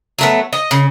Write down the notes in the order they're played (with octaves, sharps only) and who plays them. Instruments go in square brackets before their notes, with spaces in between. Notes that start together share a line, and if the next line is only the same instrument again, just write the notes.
[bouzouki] F#3 A3 B3
D#5
C#3